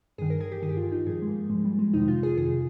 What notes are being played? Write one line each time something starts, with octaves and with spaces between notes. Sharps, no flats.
G2 D#3 G#4
A#4
G#4
G4
G2 D#3 G4 G#4
F4
D#4
G#2 F3 G#4
G#3
A#3
G#2 F3 G#3
G3
G#3
F2 C3 D#3 D#4
F4
G#4
F2 C3 D#3 G#4